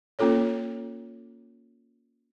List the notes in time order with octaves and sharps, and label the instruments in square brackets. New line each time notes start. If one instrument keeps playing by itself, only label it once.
[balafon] A#3 C#4 F4 A4 C#5